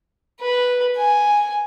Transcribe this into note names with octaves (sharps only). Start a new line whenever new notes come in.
B4
G#5